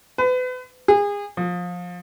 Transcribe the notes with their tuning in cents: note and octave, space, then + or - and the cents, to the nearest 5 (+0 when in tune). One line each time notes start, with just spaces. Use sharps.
B4 +35
G#4 -30
F3 +20